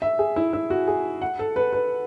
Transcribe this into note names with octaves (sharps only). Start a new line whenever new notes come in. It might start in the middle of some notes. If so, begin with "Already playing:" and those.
E5
G#4
E4
E4
F#4
G#4
F#5
A4
B4
B4